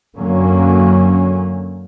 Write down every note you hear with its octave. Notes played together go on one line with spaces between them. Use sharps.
F#2 D3 F#3 A#3 C#4